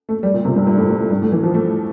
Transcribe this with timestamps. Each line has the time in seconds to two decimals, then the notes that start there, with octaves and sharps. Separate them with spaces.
0.09 A3
0.23 G3
0.34 A#2
0.45 C3
0.56 G2
0.67 G2
0.78 A2
0.89 A2
1.00 A2
1.11 G2
1.22 A2
1.32 E3
1.44 F3
1.54 A3